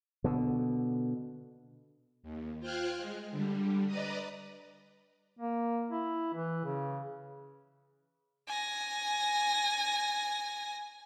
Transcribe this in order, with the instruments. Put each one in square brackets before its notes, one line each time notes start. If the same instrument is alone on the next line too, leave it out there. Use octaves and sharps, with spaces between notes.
[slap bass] B2 D3
[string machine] D#2
F4 C5 G5 F6 F#6 G#6
G#3
D3 G3
B4 D5 D#5 A#5 D#6
[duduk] A#3
E4
E3
C#3
[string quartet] G#5 A#6